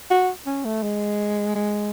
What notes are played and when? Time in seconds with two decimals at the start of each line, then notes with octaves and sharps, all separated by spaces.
0.11 F#4
0.46 C#4
0.65 A3
0.83 G#3
1.55 G#3